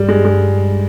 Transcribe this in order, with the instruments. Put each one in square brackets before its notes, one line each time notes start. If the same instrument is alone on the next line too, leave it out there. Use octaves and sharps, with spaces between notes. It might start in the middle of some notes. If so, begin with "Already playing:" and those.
Already playing: [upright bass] G2 [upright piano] G3
[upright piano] G#3
G#3